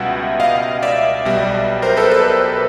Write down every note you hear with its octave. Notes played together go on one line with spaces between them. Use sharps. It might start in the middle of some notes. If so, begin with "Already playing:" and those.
Already playing: C#2 B2 G3 E5 F#5
D#5 F5
D5 E5
B1 B2 G3
A#4 C5
A4 B4
A4 B4